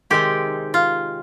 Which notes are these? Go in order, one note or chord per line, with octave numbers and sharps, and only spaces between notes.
C3 D#3 G#3 C4 D#4 G4
F4